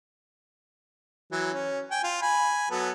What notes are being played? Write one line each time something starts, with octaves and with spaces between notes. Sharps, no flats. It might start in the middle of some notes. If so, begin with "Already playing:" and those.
E3 F#3
C#4
G5 G#5
F4
G#5 B5
F#3 B3 A4